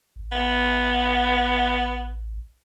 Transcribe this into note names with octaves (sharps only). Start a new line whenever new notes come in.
A1
B3